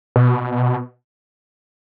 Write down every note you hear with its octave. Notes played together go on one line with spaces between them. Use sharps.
B2